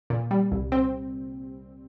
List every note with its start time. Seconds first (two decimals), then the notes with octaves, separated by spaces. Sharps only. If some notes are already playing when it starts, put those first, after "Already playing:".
0.10 A#2
0.31 G3
0.52 C2
0.72 C4